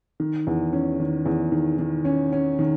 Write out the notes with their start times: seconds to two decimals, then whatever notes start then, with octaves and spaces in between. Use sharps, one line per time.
0.20 D#3
0.47 E2
0.73 C#4
1.00 D#3
1.26 E2
1.52 D#3
1.79 D#3
2.05 C#4
2.32 C#4
2.59 D#3